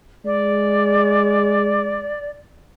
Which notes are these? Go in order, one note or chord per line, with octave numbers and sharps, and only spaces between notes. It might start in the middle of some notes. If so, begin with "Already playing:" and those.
G#3 D5